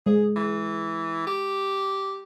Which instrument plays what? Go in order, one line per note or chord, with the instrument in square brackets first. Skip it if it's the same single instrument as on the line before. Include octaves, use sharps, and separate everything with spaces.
[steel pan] G#3 [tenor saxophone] G#4
[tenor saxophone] E3
G4